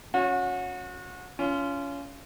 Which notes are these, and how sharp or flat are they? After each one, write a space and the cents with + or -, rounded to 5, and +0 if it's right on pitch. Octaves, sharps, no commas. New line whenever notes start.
C#4 +0 F#4 -30
C#4 +25 F4 -20